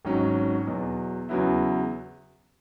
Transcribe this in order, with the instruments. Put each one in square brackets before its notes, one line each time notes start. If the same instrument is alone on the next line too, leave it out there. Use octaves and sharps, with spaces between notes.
[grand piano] G#1 G#2 F#3 C#4
E2 B2 F#3
E2 C#3 F#3 B3 E4